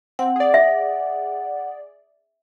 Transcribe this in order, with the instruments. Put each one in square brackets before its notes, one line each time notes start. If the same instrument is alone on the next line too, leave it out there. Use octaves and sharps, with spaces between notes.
[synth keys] C4 [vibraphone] F#5
[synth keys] G#4 D5
[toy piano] E5